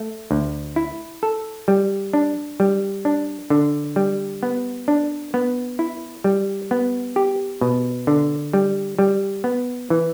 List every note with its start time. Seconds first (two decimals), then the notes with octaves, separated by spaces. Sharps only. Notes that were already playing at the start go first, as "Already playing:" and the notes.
Already playing: A3
0.31 D2
0.76 E4
1.23 A4
1.68 G3
2.13 D4
2.60 G3
3.05 D4
3.50 D3
3.96 G3
4.43 B3
4.88 D4
5.34 B3
5.79 E4
6.24 G3
6.71 B3
7.16 G4
7.61 B2
8.07 D3
8.53 G3
8.99 G3
9.44 B3
9.90 E3